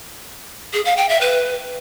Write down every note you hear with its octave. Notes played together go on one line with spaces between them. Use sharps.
G#4
F5
G5
E5
B4